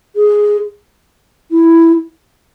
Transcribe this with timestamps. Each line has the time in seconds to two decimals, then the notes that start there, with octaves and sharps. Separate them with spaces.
0.16 G#4
1.51 E4